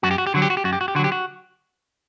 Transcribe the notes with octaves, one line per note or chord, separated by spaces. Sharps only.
F#2 F#4
G4
F#4
G4
D3 F#3 F#4
G4
F#4
G4
F#2 F#4
G4
F#4
G4
D3 F#3 F#4 G4
F#4